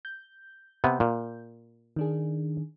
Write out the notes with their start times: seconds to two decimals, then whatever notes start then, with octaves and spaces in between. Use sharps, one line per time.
0.05 G6
0.84 C3 B3
1.00 A#2
1.96 D#3 D4 G#4